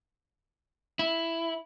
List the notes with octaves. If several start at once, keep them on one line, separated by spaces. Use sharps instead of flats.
E4